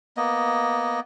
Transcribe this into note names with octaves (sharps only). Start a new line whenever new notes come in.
A#3 B3 D#5